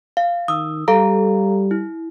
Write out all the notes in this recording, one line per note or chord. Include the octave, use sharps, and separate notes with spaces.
F5
D#3 D#6 E6
G3 A4 F5 A#5
E4